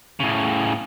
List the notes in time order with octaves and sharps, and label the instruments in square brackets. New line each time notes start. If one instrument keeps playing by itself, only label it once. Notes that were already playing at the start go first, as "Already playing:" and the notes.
[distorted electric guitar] A2 C#3